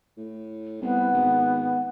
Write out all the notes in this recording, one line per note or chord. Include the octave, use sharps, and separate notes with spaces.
A2
C2 B3
G#1